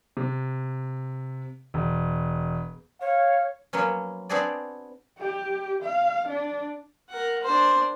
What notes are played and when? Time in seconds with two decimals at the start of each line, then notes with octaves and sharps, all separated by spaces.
0.17 C3
1.74 E1
3.01 C#5 F5
3.73 F3 F#3 A#3 B3 C#4
4.29 B3 C4 D4 F#4 G#4 D5
5.18 G4
5.83 F5
6.29 D4
7.09 A#4 F#5
7.43 D4 C5